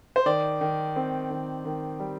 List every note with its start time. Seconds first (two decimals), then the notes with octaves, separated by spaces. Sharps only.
0.16 C5
0.26 D#3 D5
0.61 D#3
0.96 C4
1.30 D#3
1.65 D#3
2.00 G3